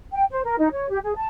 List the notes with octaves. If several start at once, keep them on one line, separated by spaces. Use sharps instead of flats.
G5
C5
A#4
D#4
C#5
G4
G#4
A5